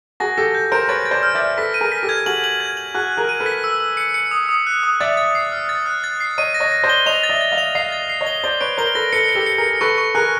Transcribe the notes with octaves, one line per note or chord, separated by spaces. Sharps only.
F#4 G#4 A#6
G4 A4 A#6
G6
A#4 C5 D7
B4 C#5 A6
A6
C5 D5
F6
D5 E5
F6
A4 B4 B6
D#7
G#4 A#4
B6
G4 A4
G#6
F#4 G#4 F#7
F#7
G#6
F#7
F#4 G#4 F#6
F#6
G#4 A#4
D#7
A4 B4
B6
E6
E6
C#7
C#7
D#6
D#6
F#6
D#6
D5 E5 A6
A6
C7
F6
A6
F#6
A6
C7
C#5 D#5 D#7
A#6
C#5 D#5
A#6
C5 D5
G7
C#5 D#5 F7
A6
D5 E5
A6
D#5 F5
F7
D#5 F5 C7
A6
C7
C#5 D#5
G7
C5 D5 G7
B4 C#5 D7
A#4 C5 G7
A4 B4 A#6
A4 B4 C#7
C#7
G4 A4
C#7
G#4 A#4
C#7
A4 B4 C#6
C#6
G#4 A#4 F#6